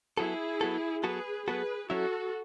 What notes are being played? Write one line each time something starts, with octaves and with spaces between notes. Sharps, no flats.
F#3 B3 E4 F#4 G#4 A4
F#3 B3 F#4 A4
F#3 B3 F#4 G#4 A4 B4
F#3 B3 F#4 G#4 A4 B4
F#3 C#4 E4 F#4 A4